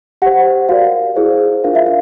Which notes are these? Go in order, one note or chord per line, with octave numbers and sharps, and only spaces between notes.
G4 C5 F#5
F#4 A#4 D5 F5
E4 G#4 C5
D4 F4 A#4 F5
E5
F5